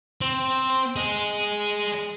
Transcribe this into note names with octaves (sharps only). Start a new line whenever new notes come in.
C4
G#4 D#5